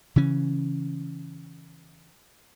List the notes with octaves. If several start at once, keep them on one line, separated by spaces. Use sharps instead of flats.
C#3 E3 C#4